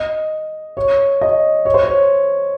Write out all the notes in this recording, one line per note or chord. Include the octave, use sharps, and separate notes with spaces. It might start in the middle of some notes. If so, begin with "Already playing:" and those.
Already playing: D#5
C#5
D#5
C#5
C5
C#5